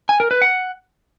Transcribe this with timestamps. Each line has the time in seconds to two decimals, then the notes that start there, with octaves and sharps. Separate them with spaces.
0.09 G#5
0.20 A#4
0.31 B4
0.42 F#5